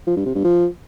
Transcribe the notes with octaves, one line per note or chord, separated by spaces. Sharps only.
F3
G2
C3
G2
F3